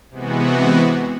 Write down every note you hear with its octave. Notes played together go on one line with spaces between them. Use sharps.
C3 E3 G#3 B3 F#4